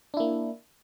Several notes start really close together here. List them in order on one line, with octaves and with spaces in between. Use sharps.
D4 E4 A#3